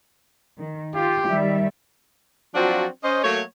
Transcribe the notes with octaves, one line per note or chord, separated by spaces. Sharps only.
D#3
F4 G4
D#3 G3 E5
F3 F#3 C4 D4 F4 F#4
C#4 C5 D#5
F#3 A3 A#3 C#5